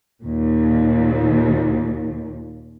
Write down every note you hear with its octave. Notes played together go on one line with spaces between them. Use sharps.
D#2 A#2